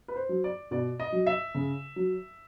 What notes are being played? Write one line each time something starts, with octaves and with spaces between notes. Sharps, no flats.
B4
C5
F#3
D5
B2 D5
D#5
F#3
E5
C#3
F#3